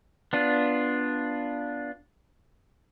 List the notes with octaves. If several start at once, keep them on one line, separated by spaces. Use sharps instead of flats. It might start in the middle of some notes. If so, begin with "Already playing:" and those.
B3 D4 F4